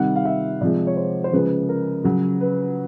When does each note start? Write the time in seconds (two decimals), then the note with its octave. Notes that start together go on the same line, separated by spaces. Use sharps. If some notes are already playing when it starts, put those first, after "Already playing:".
Already playing: C3 D#3 G3 F#5
0.15 F5
0.25 E5
0.61 C3 F3 G#3 D5
0.87 C#5
0.97 C5
1.24 C5
1.33 C#3 F3 G#3 B4
1.69 A#4
2.04 C#3 F#3
2.41 B4